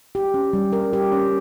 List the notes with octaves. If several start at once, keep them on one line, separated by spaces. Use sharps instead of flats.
G4
C#4
G3
A#4
G4
C#4